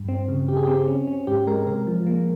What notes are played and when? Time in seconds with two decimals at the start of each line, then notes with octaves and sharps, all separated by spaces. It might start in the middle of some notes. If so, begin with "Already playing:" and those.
Already playing: G2
0.08 C4
0.28 C#3
0.48 C#3 G4
0.57 G#4
0.64 C4 G4
0.88 C#4
1.07 C#4
1.27 G#2 G4
1.47 G#3 A#4
1.67 C3 A#4
1.87 F3
2.07 A#3